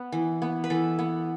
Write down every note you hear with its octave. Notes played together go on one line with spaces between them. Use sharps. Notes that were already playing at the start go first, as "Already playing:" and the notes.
Already playing: B3
E3
B3
B4
E3 A4
B3